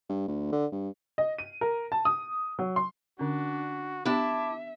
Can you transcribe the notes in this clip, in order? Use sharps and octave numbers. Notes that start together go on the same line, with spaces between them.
G2
D2
D3
G2
D#5
D#7
A#4
A5
D#6
F#3
C6
D3 C#4 D4 F#4
B3 D4 E4 G4 E5 A5 D6